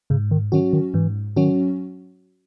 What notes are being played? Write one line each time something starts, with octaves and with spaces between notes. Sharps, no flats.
G#2 C#3
D#3
D#3 F#3 C#4 F#4
D#3
G#2 E3
D#3 F#3 C#4 F#4